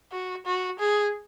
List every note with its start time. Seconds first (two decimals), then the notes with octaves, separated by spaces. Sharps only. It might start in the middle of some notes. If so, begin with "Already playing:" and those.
0.12 F#4
0.46 F#4
0.79 G#4